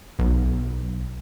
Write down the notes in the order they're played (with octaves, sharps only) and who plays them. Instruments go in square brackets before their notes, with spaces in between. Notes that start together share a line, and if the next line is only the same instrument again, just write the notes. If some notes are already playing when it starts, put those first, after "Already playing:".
[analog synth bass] B1